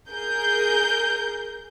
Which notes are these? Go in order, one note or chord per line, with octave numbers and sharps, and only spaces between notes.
G#4 A#4 G6